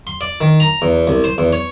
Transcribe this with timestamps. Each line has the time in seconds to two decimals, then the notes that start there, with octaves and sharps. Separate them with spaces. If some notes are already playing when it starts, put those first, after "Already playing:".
0.07 C6
0.21 D5
0.41 D#3
0.60 A#5
0.82 E2
1.07 C2
1.24 C5
1.38 E2
1.53 C#5